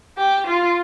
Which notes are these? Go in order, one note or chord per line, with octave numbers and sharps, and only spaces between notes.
G4
F4